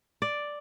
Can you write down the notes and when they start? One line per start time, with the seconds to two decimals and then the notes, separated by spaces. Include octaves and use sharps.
0.22 D5